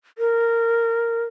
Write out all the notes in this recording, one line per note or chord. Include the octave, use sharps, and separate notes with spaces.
A#4